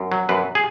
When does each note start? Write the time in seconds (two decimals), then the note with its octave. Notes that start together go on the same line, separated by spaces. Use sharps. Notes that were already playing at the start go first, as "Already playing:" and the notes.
Already playing: F#2
0.12 F#3
0.29 F#2 B4
0.55 G#4